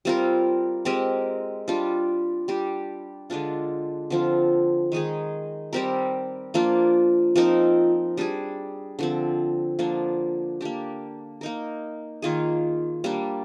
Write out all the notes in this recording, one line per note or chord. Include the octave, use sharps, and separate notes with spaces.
G3 C4 F4 A#4
G#3 C4 G4 A#4
G3 D4 F4
G3 D4 G4
D3 G#3 D4 F4
D3 F3 C4 F4
D#3 G#3 D#4 G#4
G3 C4 G4 A#4
F3 A#3 D4 F4
F3 C4 D#4 A#4
G3 D4 G#4
D3 F3 C4
D3 F3 A#3 D4
A#3 D4 G4
A#3 D#4 A#4
D#3 A#3 F4 G#4
G3 A#3 D4